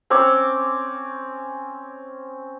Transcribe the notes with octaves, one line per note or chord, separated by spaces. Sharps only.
C4 C#4 C#5 D6